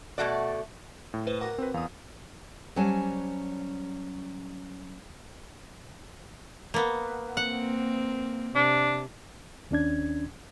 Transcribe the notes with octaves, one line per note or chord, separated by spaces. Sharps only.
B2 E3 A3 F#4 D5
A2
B4 C5
F#4 A#4 F#5 D6
C4 B4
E2 F5 D#6
F#3 G3 C#4 C5 G#5 A5
A#3 B3
A#3 C4 F#5
C3 D4
D#2 C#4 D4 G#6